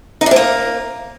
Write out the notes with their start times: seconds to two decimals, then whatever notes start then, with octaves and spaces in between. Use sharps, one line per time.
0.21 D#4
0.26 D4
0.31 C4
0.36 A#3